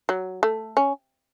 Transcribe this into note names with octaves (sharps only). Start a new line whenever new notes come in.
F#3
A3
C#4